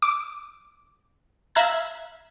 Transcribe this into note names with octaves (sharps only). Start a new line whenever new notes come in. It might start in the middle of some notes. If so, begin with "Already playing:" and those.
D6
E5 F5 A#5 E6 F#6 G#6